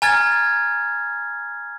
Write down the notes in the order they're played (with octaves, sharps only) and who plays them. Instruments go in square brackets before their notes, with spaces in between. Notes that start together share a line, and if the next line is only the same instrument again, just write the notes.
[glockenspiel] G#5 A#5 F6 G#6 A6